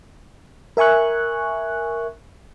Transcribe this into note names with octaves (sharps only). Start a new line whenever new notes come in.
A#4 E5 G#5 C#6 F#6